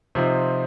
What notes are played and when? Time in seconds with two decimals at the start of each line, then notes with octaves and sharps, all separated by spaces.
0.15 C3 F3 C4 D#4